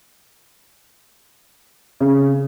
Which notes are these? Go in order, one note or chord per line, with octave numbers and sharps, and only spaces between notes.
C#3